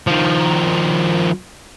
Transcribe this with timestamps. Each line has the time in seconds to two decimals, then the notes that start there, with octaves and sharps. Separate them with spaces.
0.07 D#3 F3